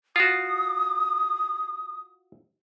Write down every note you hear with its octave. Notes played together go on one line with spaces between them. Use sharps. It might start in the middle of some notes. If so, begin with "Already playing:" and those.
F4 F#4 D#6